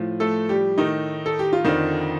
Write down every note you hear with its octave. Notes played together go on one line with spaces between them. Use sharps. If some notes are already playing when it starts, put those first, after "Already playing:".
Already playing: A2 F3
A3 A4
G3 G4
A2 D#3 A3 D#4
A4
G4
F4
F2 D3 D#3 F3 D#4